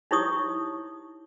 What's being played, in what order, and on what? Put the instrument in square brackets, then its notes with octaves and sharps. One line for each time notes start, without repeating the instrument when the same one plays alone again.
[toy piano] D#4 E4 G4 C#5 C#6 D#6